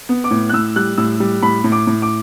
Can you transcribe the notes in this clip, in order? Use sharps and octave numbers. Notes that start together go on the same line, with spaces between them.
B3
D6
A2
F#6
A2 E6
G3 F#6
A2 E6
G3
A2 B5
A2
D6
A2
D6